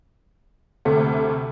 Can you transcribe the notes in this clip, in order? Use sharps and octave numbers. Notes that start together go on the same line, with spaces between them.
D2 C3 A3